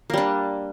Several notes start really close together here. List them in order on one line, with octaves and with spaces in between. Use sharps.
A#3 G3 D4